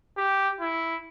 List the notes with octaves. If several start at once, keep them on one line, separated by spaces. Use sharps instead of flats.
G4
E4